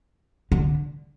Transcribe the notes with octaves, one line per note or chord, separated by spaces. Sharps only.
D3